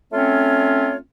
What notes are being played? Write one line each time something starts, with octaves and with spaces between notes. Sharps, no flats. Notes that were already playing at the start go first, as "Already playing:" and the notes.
A3 C4 C#4 F4 C#5